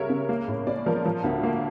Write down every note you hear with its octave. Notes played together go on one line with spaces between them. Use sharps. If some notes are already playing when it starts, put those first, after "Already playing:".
Already playing: C#2 G3 A#4 C#5 E5
C#3
A#3
A2
C#4 D5
F3 A#4
F3
D2
A#3